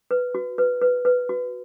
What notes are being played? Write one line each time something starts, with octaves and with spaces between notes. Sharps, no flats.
B4
F#4
B4
B4
B4
F#4